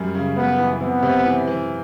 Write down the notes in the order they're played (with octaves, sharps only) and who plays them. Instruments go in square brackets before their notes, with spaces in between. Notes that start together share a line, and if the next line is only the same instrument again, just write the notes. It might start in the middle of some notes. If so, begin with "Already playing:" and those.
Already playing: [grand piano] F#2 G3
C#3
[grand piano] F#2 [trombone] B3
[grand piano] E3
[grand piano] C3 [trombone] B3
[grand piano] C3
E3
E3